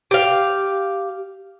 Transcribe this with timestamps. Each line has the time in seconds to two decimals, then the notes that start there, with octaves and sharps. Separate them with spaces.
0.11 G4 F5